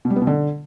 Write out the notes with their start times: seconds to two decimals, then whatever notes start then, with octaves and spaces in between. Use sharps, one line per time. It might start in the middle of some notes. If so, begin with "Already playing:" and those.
0.05 B2
0.10 G3
0.16 B3
0.22 B2
0.27 D3